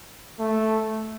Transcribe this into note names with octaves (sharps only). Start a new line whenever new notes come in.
A3